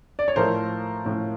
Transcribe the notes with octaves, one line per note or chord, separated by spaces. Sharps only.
D5
C#5
A2 F3 A3 A#4 C5
A2 F3 A3